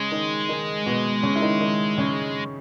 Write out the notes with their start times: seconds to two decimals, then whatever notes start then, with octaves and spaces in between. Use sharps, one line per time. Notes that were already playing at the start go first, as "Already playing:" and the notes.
Already playing: C#3 G#3 C#4
0.11 D#3 D#4
0.49 D#3 D#4
0.86 B2 B3
1.23 C#3 C#4
1.36 E4
1.42 D#3 D#4
1.61 D#3 D#4
1.98 C#3 C#4